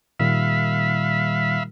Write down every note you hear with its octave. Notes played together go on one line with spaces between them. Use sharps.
A#2 D#3 G3 E5 F5 B5